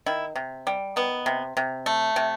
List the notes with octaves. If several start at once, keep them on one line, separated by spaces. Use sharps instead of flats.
D#3 E4
C3
G3
D#3 B3
C3
C3
A3
C3